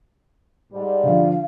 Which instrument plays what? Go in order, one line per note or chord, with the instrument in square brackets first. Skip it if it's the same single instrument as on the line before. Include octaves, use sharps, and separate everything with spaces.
[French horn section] G#2 G3
[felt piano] D3 F3 [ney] F5